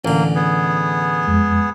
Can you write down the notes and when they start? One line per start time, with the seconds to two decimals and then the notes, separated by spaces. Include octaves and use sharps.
0.05 A1 D3 A#3
0.35 B3 G#4
1.27 F2 G#3